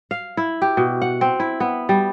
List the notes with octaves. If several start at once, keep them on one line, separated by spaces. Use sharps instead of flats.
F5
E4
G4
B2
F#5
C4
E4
B3
G3